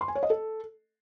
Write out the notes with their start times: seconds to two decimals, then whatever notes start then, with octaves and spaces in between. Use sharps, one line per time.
0.01 C6
0.08 G#5
0.15 C#5
0.23 D#5
0.30 A4